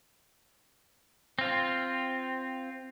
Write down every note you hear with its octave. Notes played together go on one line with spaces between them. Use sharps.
C4 F4